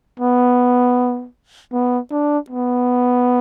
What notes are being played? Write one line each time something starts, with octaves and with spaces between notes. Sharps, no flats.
B3
B3
D4
B3